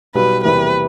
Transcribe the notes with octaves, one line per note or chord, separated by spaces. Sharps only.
B1 B2 G3 B4
E2 C3 E3 G3 A#3 B4